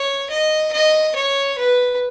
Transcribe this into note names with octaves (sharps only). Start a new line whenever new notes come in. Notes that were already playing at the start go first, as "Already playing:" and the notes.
Already playing: C#5
D#5
D#5
C#5
B4